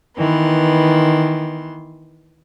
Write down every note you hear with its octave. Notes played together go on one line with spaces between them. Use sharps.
D#3 E3 B3 C6